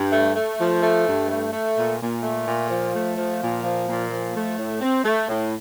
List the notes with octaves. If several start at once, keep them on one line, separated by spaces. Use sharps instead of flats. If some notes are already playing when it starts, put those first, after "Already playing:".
Already playing: G2
A3
A3
F3
A3
G2
A3
A3
A#2
A#2
A3
A#2
F3
A3
F3
A#2
F3
A#2
F3
A3
A2
C4
A3
A2